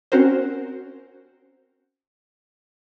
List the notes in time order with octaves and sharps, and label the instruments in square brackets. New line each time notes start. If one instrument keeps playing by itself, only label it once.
[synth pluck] C4 C#4 F#4 A#4 C5